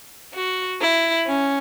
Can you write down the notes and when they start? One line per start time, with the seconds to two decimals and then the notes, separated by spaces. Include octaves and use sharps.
0.33 F#4
0.81 E4
1.27 C#4